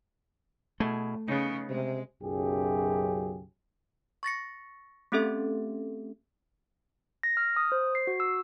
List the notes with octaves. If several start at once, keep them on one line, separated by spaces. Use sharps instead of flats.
B2 A3 E4 G#4
C#3 B3 D#4
C3 G#3
B1 F#2 C#3 G4 G#4
C#6 A6 A#6 C#7
A3 C4 C#4 G4 A4 E5
A#6
F6
D#6
C5
C7
F#4
E6